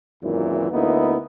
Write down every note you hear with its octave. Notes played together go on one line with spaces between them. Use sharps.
G#1 F#2 A#2 E3 E4
D2 A#3 B3 D#4 E4